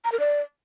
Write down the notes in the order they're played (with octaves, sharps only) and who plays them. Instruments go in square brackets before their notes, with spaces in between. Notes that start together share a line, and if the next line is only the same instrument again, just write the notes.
[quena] A#5
A#4
D5